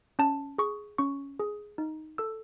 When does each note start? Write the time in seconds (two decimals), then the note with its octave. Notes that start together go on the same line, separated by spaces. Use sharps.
0.19 C#4 A5
0.58 G#4 C#6
0.98 C#4 C#6
1.39 G#4
1.78 D#4
2.18 A4 E6